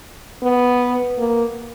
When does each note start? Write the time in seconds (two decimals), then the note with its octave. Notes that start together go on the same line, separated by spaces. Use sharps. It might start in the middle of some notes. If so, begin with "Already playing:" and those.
0.42 B3
1.18 A#3